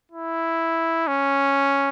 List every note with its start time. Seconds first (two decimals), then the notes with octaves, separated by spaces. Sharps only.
0.12 E4
1.07 C#4